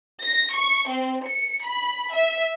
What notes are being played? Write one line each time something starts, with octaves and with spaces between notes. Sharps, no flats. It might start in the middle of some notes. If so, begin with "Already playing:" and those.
A#6
C#6
C4
C#7
B5
E5